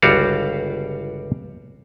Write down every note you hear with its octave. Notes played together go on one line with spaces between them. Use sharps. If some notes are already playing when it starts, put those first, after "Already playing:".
G1 C#2 G3 F#4 D5 F5